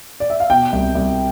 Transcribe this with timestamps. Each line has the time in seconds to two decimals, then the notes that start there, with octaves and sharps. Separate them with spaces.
0.20 D5
0.30 E5
0.40 F5
0.50 B2 G5
0.72 C2
0.95 C2